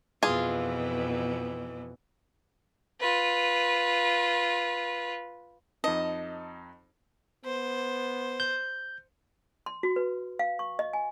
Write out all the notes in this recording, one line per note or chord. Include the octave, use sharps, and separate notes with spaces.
F2 B2 E3 F4 G#4
F4 B4
F2 D#4 D#5 A5
B3 C5
G6
C6
F#4
B4
F5
C#6
D#5
G#5